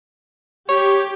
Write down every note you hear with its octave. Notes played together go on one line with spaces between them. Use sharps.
G4 C#5